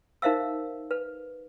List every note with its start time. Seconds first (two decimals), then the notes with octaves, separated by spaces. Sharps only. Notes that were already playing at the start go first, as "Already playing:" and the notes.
0.22 D#4 A#4 C5 E5 F5 E6
0.91 B4